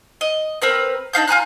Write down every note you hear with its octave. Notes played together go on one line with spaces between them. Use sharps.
D#5
C4 A#4 B4
D4 D#4 F5 G6
F4 G#5 A#5 F#6